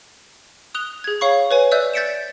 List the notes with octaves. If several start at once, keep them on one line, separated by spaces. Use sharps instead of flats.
D#6 F#6 F7 G7
G#4 G#6
C#5 F5 B5 C#6
B4 C#5 G#5
D5 E5 E6 F#6 G6
G6 A6 B6 C#7 D7 E7